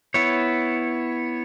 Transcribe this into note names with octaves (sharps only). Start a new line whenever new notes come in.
B3 E4 C#5